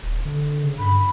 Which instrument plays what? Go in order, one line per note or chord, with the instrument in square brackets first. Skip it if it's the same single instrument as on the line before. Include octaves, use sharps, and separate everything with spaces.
[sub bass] D#1
D3
C#3
[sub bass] G2 [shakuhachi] B5